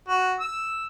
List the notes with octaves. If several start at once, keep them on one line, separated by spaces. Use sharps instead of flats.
F#4
E6